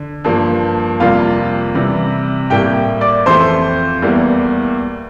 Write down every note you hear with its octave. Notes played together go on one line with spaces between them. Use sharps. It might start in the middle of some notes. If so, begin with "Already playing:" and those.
Already playing: D3
G2 F3 A#3
F2 C3 G3 A#3 F4 F5
C3 E3 G3
A2 G3 A#3 G4 G5
D5 D6
F2 E3 A3 C5 C6
E2 E3 G3 A#3